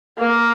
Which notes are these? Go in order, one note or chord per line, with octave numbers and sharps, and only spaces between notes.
A#3